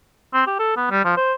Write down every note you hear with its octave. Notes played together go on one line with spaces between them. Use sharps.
C4
G4
A4
B3
G3
F3
C5